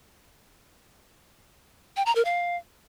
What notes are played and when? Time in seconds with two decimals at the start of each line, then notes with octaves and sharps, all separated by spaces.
1.97 G5
2.06 A#5
2.15 A#4
2.25 F5